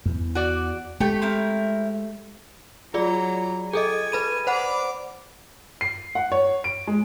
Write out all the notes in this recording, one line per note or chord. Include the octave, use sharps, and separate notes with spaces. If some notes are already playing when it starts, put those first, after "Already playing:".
E2
F#4 D5
G#3 A3 G4 G5 C#6
C4 E4 A#4
F#3 F4 G#4 D5 A#5
G#4 A4 D#5 G#5
B4 B5 D#7
C5 D5 F#5 B5
C7
F#5
C#5
D7
G#3